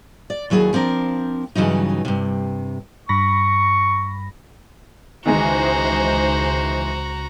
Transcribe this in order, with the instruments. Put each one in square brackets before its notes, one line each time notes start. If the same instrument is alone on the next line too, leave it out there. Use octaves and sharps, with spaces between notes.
[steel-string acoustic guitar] D5
D#2 F#3 E4 G#4
F3 C4 D4 A#4
G2 C#3 E3 F#3 D#4
G2 C3
[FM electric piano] G2 B5 A#6 [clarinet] C#6
[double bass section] C#2 [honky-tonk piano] D#3 E3 G#3 [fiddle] F#4 A#5 [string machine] C5